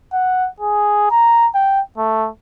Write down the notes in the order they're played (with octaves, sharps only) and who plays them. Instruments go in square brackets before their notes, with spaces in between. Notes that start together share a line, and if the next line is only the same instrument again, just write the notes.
[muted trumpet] F#5
G#4
A#5
G5
A3